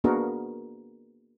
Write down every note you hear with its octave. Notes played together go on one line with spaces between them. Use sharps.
A#3 B3 D4 F#4 G#4 A#4